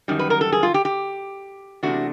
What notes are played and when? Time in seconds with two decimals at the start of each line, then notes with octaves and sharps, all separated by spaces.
0.08 F#2 D#3 G3
0.19 B4
0.30 A#4
0.41 A4
0.52 G#4
0.63 F4
0.74 G4
0.85 G4
1.83 E2 C3 E3 A3 D4 F#4